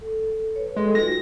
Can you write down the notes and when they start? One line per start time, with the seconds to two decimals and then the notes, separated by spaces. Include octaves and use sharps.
0.01 A4
0.56 B4 C#5
0.76 G#3 G#4 A4 G5
0.95 D#4 F4 F#4 A#6